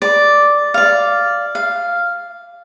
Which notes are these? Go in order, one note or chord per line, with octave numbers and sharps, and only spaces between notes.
D5
D5 F5
F5